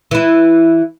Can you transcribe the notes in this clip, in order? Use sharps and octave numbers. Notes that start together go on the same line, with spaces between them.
E3 E4